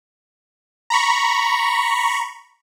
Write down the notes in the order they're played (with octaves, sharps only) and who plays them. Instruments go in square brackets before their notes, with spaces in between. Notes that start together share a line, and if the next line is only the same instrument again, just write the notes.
[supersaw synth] A#5 B5 C#6